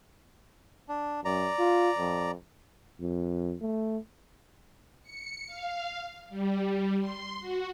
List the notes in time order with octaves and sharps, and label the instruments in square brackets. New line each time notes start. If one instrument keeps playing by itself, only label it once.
[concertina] D4
[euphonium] F#2 [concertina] D5 A#5
[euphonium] F4
F2
[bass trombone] F2
A3
[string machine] C#7
F5
G3
C6
F#4